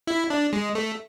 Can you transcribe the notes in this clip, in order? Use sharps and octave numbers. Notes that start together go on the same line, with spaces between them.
E4
D4
G#3
A3